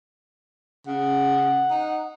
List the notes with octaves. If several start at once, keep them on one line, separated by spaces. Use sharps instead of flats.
C#3 F#5
D#4